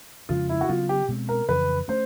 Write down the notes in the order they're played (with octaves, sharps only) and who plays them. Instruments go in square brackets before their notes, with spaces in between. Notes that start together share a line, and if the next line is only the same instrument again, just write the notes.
[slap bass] F2 C#3 F3 G#3 [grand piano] F4
[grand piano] E4
F#4
[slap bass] C#3 F#3 B3 [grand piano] F4
[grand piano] G4
[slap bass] B2 G#3 C4
[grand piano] A#4
[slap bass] F2 C#3 E3 [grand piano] B4
[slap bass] A3 C#4 [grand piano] C5